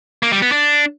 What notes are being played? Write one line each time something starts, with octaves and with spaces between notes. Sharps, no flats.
A#3
G3
B3
D4